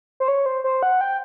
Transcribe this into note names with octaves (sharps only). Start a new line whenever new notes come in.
C5
C#5
C5
C5
F#5
G5